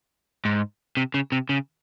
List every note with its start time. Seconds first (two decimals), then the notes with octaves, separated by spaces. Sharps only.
0.45 G#2
0.97 C3
1.14 C#3
1.32 C3
1.49 C#3